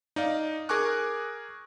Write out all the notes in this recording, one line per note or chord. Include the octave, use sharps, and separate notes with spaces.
D#4 D5 F5
G#4 A#4 G#5 C#6 D6 F#6